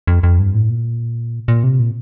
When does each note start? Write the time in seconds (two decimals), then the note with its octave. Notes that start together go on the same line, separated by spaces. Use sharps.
0.07 F2
0.23 F2
0.39 G2
0.55 A2
0.70 A#2
1.48 A#2
1.63 C3
1.79 A#2